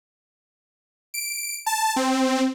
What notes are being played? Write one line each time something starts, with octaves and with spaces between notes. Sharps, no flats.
D7
A5
C4